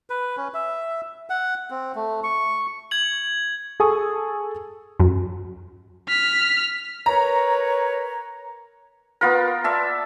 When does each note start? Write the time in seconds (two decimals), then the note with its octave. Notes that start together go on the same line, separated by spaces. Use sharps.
0.10 B4
0.37 C#4
0.54 E5
1.30 F#5
1.70 C4
1.95 A3
2.24 C#6
2.91 G#6 F#7
3.80 G#4 A4 G#5 C#6 D#6
5.00 F#2
6.09 F6 B6
7.06 A#4 B4 C#5 A#5
9.21 B3 F4 A#4
9.64 D5 E5 A5